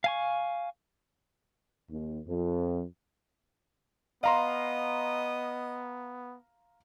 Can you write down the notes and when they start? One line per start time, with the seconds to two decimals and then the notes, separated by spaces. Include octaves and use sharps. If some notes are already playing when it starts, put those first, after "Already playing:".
0.04 F5 G#5 C#6
1.90 D#2
2.27 F2
4.24 B3 D#5 F5 A#5 C6